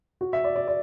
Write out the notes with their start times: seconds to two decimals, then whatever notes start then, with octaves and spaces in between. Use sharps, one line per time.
0.21 F#4
0.33 E5
0.44 D5
0.56 D5
0.68 D5